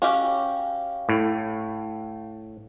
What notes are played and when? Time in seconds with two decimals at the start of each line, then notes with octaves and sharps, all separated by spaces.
0.02 C#4 F#4 G4 F5
1.09 A2